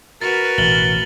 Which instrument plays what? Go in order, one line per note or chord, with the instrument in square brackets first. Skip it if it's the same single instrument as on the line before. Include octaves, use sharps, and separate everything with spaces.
[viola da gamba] F#4 A#4 B4 [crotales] A6
[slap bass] A1 B2 [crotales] A6 F#7 G7